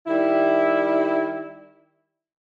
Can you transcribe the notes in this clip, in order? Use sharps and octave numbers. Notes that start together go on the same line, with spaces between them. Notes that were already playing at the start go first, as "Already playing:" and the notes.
D#3 G3 E4